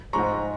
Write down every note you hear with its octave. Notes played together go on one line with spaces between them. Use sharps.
G#2 F3 G#3 A#5 C#6